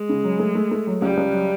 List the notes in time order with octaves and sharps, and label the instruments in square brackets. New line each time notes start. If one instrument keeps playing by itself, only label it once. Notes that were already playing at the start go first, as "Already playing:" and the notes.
Already playing: [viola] G#3
[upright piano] C#3
F#3
A3
A3
A3
F#3
[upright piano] C#2 [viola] G3
[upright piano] C#2
F#3